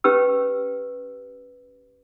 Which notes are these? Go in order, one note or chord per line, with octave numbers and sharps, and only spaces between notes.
C#4 G4 B4 E6